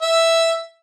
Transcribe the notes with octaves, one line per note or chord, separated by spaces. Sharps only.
E5